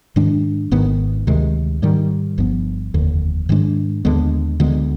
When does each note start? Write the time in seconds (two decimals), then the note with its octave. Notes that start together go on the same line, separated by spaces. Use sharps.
0.16 G#2 D#3 G#3 D4
0.71 G#1 G#2 D#3 B3
1.27 D2 C3 D#3 G#3
1.82 G#2 D#3 G3
2.38 G1 G2 F3 B3
2.94 F1 D#2 D3
3.49 G#2 D#3 G#3 D4
4.05 D#2 D3 G#3 B3
4.60 D2 D3 G#3 B3